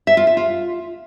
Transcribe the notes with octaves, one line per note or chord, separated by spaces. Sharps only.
E5
F4
E5
F4